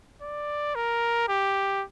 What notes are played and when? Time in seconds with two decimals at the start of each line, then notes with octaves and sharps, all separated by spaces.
0.22 D5
0.75 A#4
1.28 G4